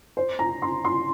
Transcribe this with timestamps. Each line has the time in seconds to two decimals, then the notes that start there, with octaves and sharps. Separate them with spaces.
0.17 C5
0.39 A#5
0.62 C6
0.85 C6